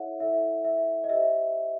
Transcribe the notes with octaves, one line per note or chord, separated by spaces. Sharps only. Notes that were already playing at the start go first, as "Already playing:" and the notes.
Already playing: E4 A4 C#5 E5 F#5
E4 A4 C#5 E5
E5
D#5
G4 C5 E5